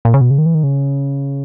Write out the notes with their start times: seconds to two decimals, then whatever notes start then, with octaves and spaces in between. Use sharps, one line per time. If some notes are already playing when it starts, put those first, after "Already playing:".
0.05 A#2
0.14 C#3
0.21 B2
0.30 C#3
0.38 D#3
0.46 E3
0.55 D#3
0.63 C#3